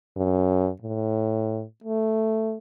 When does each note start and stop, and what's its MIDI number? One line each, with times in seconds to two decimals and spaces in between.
0.16 0.69 42
0.81 1.64 45
1.84 2.57 57